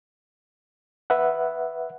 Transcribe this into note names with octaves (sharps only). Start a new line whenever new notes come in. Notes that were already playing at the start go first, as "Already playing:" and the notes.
B4 E5 F#5